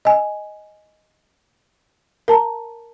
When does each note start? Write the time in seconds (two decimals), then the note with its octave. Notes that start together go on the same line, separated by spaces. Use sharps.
0.05 D#5 G#5
2.28 A#4 A5 A#5